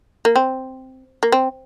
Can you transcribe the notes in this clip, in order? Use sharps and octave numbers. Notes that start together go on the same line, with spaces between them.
A#3
C4
A#3
C4